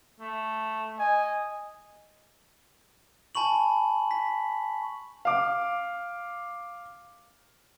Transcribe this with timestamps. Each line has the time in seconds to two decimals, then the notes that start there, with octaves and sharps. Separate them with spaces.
0.20 A3
0.99 D#5 G#5
3.35 G#5 A5 B5 C#6 F#7
4.11 B6
5.25 F5 D6